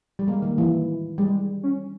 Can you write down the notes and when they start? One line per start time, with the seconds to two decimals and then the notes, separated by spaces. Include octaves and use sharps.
0.19 G3
0.28 G#3 A#3
0.42 D#3
0.58 E3
1.18 G3 G#3
1.63 C#4